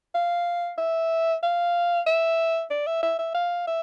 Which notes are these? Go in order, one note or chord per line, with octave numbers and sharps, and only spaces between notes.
F5
E5
F5
E5
D5
E5
E5
E5
F5
E5